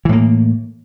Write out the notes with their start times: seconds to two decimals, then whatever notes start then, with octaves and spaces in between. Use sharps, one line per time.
0.05 E3
0.09 A2
0.13 A#3